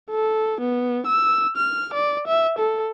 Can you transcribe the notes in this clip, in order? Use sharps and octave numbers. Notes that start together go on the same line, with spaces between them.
A4
B3
E6
F6
D5
E5
A4